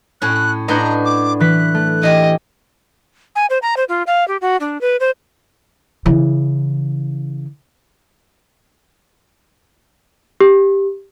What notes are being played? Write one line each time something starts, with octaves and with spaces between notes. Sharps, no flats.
A2 C#4 F#6
A2 D4 B4 D#5 F#5 A#5 G6
D6
E3 B4 F#6 B6
A3
E3 G4 D#5
G#5
C5
A#5
C5
F4
F5
G4
F#4
D4
B4
C5
C#3 E3
G4